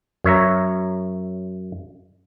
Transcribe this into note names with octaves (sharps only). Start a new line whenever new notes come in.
F#2 C#5 E5 A#5